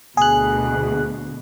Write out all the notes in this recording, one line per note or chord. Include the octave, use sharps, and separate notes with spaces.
D2 B2 G#4 F#6